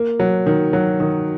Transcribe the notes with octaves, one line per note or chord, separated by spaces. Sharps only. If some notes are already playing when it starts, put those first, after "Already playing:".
Already playing: A#3
F#3
D#3
F#3
D#3